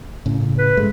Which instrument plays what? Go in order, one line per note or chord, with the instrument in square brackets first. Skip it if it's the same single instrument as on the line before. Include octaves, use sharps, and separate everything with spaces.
[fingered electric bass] A2 C#3
[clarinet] B4
[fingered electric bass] G2 G#3 A3